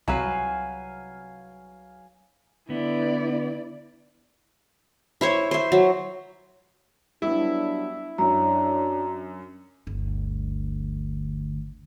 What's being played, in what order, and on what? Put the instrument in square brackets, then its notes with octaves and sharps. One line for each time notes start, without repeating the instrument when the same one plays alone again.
[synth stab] C2 [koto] F#3 B4 [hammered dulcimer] F5 G#5
[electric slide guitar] D3 B3 [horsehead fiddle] E4 D5
[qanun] E4 C5 C#5
C5 E5
F#3
[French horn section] F#3 D4 [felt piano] G3 B3 [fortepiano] E4
[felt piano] F#2 [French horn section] D4 C#5 [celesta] A#5
[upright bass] G1 D2